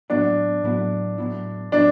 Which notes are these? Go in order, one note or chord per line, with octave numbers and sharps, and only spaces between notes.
A2 F#3 B3 D4 E4
A2 F#3 B3 E4
A2 F#3 B3 E4
A2 F#3 B3 D4 E4